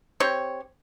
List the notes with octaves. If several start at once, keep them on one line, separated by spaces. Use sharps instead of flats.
C4 G4 C#5